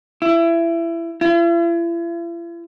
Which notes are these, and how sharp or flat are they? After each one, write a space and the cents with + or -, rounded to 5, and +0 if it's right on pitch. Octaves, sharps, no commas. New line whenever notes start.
E4 +25
E4 +45